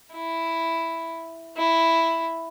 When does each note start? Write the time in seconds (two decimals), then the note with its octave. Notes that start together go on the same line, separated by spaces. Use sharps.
0.14 E4
1.58 E4